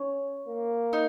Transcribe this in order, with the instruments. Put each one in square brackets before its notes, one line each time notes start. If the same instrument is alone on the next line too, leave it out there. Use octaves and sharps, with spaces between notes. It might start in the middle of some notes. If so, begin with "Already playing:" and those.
Already playing: [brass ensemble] C#4 [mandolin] C#5
[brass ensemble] A#3
[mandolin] D#4